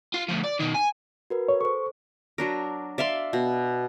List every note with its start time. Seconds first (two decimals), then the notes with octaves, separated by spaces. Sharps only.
0.14 F4
0.29 D2 F3
0.44 D5
0.60 B2 D#3
0.75 G#5
1.30 F#4 A#4 B4
1.48 C#5
1.61 A4 C5 C#6
2.38 F#3 D4 A#4
2.98 D5 E5 F5 C6
3.33 B2